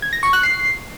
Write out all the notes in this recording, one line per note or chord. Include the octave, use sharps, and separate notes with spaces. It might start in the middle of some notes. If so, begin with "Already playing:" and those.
G#6
A#6
C#6
F#6
C7